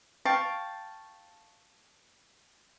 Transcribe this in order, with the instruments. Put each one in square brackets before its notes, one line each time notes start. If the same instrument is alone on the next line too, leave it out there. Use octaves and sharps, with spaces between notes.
[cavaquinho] F5 G5 A5 C#6